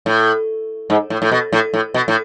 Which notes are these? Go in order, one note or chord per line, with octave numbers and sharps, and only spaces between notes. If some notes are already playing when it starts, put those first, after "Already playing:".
A2
G#2
A2
A2
B2
A2
A2
B2
A2